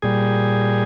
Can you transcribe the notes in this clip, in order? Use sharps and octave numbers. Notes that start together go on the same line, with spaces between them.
A#2 G3 G#4